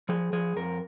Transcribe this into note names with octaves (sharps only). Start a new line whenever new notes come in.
F3 G#4
F3 G#4
F2 A#4